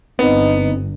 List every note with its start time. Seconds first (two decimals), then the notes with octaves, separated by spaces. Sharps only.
0.19 G1 B3 C4 D#4